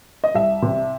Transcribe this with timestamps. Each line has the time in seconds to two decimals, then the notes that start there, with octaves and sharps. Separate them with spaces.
0.24 D#5
0.35 C2 E5
0.62 C3